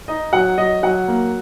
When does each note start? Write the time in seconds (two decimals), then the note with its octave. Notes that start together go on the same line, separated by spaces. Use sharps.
0.08 D#4 D#5
0.33 F#3 F#5
0.58 F#3 D#5
0.83 F#3 F#5
1.08 A#3